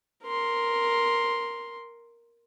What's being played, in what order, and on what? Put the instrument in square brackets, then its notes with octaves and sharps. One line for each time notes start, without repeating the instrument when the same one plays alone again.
[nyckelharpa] A#4 C6